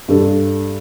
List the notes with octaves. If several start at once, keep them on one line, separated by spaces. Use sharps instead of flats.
G2 G3 D4 A4